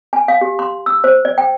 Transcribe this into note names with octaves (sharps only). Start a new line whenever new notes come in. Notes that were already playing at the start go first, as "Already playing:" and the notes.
G#5
F5
G4
C6
E6
C5
D5
G5